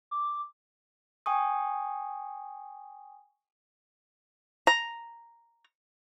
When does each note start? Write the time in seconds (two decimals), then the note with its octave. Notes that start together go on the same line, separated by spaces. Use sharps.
0.11 D6
1.26 G5 G#5 C#6 D#6
4.67 A#5